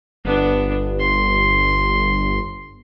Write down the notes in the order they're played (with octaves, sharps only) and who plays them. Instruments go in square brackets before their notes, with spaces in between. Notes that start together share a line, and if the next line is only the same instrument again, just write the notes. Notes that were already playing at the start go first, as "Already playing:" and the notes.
[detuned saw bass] G1 [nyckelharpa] B3 D4
[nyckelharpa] C6